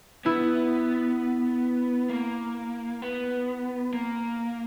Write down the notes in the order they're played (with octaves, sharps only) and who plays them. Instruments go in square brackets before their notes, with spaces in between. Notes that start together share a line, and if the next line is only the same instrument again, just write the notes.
[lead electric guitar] B3 [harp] E4
[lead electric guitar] A#3
B3
A#3